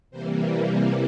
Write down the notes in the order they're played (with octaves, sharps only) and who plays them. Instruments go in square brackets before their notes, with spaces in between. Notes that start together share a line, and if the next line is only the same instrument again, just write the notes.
[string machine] C3 E3 G3 A#3 C5